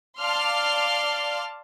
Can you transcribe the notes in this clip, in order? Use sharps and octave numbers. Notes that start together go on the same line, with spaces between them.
D5 F5 A5 C6 F6